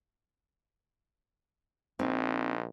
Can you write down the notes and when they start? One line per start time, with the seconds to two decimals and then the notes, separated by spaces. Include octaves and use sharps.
1.99 A#1 C4 D#4